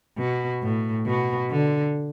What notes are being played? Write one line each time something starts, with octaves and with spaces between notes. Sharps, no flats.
B2
A2
B2
D3